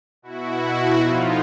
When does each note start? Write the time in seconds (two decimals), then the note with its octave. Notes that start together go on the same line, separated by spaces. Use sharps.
0.22 B2 E4 F#4
0.98 A2 F3 D#4 F4